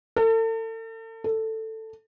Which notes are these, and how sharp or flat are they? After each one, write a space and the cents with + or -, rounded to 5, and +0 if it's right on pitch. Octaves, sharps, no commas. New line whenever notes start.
A4 +40
A4 +10